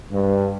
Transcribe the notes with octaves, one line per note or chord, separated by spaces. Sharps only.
G2